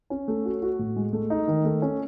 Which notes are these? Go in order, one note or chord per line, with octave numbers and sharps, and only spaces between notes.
C#4
A3
F#4
F#4
A2
G#3
A3
D#4
D#3
A3
C#4